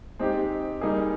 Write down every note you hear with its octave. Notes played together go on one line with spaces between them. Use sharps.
G#3 C4 D#4 G4
G3 A#3 D#4 G#4